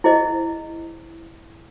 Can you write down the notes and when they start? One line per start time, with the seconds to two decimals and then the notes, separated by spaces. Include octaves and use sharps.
0.04 E4 G#4 C5 D#5